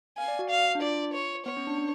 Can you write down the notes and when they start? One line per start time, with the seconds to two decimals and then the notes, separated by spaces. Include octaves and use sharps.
0.17 F5 G#5
0.28 D5
0.39 F#4
0.49 F5
0.75 D4
0.81 F4 D5
1.13 C#5
1.46 B3 C#5
1.57 C#4
1.67 D4
1.78 D4